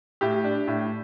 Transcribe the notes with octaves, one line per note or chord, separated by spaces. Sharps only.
A2 G4
D4
A2